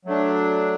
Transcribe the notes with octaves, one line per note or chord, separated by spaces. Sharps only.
F#3 A3 D4